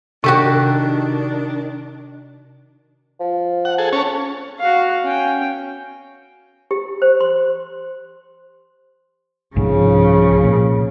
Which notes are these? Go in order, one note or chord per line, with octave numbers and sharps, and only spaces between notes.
C3 D#3 D4 F#4 G4 A4
F3
F#5
G#4 A4
C#4 C#5 A5
F#4 F5
C#4 G5
G4
C5
C6
C2 G#2 C#3 F3
A#2